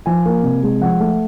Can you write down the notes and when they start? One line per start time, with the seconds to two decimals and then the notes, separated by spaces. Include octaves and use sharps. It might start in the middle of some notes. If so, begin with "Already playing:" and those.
0.06 F3 G#5
0.26 A#3
0.43 C3
0.63 G#3
0.81 F3 F#5
1.00 A3